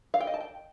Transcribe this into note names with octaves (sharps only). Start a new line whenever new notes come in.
F5
G5
D#5
A5
G5